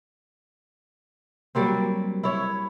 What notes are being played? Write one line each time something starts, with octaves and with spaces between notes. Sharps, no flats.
F#3 G3 A#3 C4
E4 C#5